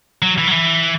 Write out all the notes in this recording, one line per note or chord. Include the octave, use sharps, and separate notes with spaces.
F#3
E3
F#3
E3